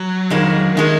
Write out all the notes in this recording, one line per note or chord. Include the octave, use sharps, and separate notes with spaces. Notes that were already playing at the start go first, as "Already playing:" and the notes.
Already playing: F#3
F2 D#3 G#3
D#3 G#3 A#3